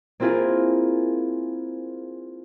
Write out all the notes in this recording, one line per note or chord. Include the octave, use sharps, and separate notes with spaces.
A#3 C4 E4 F4 G#4 A#4